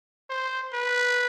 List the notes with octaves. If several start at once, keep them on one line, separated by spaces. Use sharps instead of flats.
C5
B4